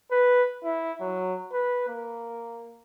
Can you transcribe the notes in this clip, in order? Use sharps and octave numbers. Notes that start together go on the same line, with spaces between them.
B4
E4
F#3
B4
A#3